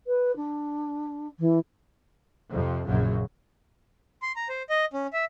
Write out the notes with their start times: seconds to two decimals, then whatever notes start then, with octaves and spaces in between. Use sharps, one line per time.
0.07 B4
0.36 D4
1.39 E3
2.50 F2 C3 F3
2.86 A#1 F#2 A#2 C#3 F#3
4.22 C6
4.36 A#5
4.49 C5
4.70 D#5
4.93 C#4
5.13 E5